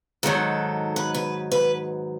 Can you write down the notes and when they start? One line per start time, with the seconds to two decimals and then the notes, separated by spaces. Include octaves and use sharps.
0.23 G#2 D#3 F#3 A4
0.96 B4
1.14 B4
1.52 B4